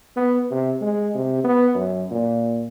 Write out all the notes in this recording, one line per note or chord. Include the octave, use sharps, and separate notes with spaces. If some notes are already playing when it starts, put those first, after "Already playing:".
B3
C3
G#3
C3
B3
F#2
A#2